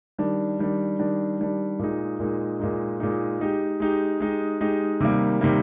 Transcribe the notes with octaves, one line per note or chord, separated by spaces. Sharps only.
D#3 G3 D4
D#3 G3 D4
D#3 G3 D4
D#3 G3 D4
A#2 G#3 D#4
A#2 G#3 D#4
A#2 G#3 D#4
A#2 G#3 D#4
G#3 D#4 G4
G#3 D#4 G4
G#3 D#4 G4
G#3 D#4 G4
C3 D#3 G3 A#3
C3 D#3 G3 A#3